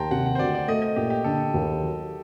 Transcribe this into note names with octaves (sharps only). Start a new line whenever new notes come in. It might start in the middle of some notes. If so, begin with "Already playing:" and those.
Already playing: D#2 G5 A5 A#5 C6
C3 F#5
F#5
C5
D2 D5
D5
A3 D#5
D#5
A#2 G4
G4
D3 A4
D#2
F#3